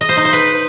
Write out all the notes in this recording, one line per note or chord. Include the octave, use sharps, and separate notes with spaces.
D#5
C5
D#4
C5
B4